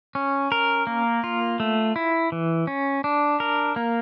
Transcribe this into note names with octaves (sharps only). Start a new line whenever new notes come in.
C#4
A#4
A#3
F4
A3
E4
E3
C#4
D4
A#4
A#3